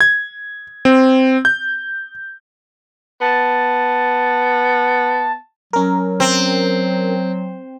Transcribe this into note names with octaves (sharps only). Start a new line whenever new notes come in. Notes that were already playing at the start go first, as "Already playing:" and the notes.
G#6
C4
G6
B3 A5
F#3 C#4 A#4
C4